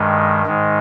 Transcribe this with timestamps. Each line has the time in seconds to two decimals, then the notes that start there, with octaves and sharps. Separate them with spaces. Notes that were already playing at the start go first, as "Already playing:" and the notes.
Already playing: G2 D#3 G#3
0.46 G#2 D#3 G#3